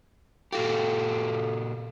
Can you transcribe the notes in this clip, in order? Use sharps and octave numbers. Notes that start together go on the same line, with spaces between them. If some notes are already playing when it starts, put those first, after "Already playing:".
A#2 F#4 G4 A4 F5